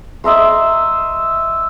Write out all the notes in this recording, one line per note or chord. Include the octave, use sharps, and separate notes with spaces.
D#5 E5 A#5 C6